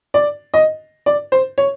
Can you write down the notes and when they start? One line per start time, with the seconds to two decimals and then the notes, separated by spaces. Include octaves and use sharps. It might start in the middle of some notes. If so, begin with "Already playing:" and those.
0.14 D5
0.54 D#5
1.06 D5
1.32 C5
1.58 C#5